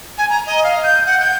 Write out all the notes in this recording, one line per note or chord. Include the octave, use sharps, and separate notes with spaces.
G#5
A#5
D#5
F5
G6
F#5
G6